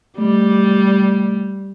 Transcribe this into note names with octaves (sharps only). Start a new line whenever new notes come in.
G3 A3